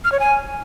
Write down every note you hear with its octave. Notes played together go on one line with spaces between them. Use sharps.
F6
C#5
G#5